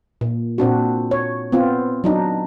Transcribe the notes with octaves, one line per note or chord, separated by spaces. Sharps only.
A#2
A#2 C4 D4 F#4
C#5
B3 C4 F4
F#3 D4 D#4